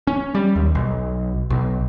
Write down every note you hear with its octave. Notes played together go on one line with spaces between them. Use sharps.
C#4
G3
D#2
B1
B1